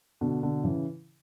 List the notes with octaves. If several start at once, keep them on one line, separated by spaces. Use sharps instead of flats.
B2 D3
B2 D3
C#3 E3